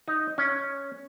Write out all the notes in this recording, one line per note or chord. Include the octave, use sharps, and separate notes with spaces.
D#4
C#4